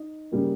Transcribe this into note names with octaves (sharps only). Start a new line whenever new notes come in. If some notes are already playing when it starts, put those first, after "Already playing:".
Already playing: D#4
C#3 G3 A#3